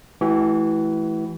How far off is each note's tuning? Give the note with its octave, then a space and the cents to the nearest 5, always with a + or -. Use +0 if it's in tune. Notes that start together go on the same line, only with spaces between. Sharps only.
E3 +0 A3 -35 F#4 +40